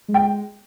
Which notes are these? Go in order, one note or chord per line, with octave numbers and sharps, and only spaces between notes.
G#3
G5